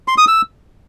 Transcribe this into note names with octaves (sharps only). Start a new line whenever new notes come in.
C6
D#6
E6